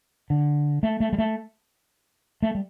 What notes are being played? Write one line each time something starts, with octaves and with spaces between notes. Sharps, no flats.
D3
A3
A3
G3
A3
A3
G3